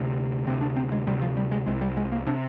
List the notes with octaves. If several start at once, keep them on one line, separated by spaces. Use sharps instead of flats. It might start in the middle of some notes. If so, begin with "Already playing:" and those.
Already playing: D2 C3
D2 C3 C4
D4
C4
G#3
D2 C3 G3
F3
G3
G#3
C2 C3 G#3
G3
G#3
A#3
C3 D4